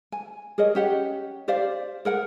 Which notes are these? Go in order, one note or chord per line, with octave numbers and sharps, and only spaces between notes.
G#5
G#4 A#4 C#5 D#5
C#4 G4 F#5
G4 C5 D5 F5
G#4 A#4 F#5